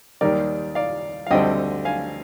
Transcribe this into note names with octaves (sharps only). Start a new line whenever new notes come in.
D#2 D#3 G3 A#4 D5
D5 F5
F5
D2 D3 G3 C4 D#5 G5
F5 G#5